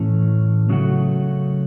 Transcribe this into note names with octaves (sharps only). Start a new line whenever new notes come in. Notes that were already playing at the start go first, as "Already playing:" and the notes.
Already playing: A2 E3 A3 C#4 A4
C#3 F#3 A3 F#4